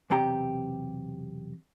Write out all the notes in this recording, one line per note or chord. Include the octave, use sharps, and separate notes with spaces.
B1 E2 C3 G4 A#5